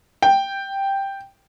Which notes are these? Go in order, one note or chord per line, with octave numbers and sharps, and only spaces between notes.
G5